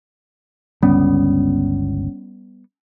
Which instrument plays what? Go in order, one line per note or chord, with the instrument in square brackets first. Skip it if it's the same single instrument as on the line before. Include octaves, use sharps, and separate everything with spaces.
[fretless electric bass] G1 C#2 [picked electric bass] G3 B3 [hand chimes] C#4